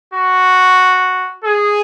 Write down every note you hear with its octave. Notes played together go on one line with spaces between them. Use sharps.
F#4
G#4